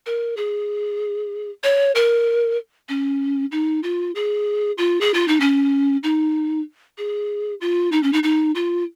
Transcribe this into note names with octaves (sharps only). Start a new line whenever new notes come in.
A#4
G#4
C#5
A#4
C#4
D#4
F4
G#4
F4
G#4
F4
D#4
C#4
D#4
G#4
F4
D#4
C#4
D#4
D#4
F4